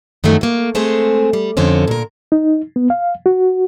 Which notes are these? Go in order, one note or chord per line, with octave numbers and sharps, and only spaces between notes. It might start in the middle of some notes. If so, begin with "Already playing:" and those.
F#2 D#3 F3 F#3 A3
A3 A#3
G#3 A3 C4 G#4
G3
F2 D3 C4 C#4
A#2 A#4
D#4
B3
F5
F#4